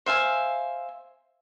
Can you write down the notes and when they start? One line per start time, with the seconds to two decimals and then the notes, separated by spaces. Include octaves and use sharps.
0.06 C5 E5 F5 G#5